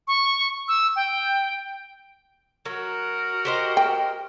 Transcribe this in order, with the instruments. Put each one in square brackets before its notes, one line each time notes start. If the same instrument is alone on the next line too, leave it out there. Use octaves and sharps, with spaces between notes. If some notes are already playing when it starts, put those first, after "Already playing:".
[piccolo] C#6
E6
G5
[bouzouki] F#3 [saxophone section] F#4 A#4
[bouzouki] G4 C5 D#5
[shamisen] G5